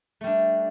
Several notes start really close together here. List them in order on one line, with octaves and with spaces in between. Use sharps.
A3 G3 D4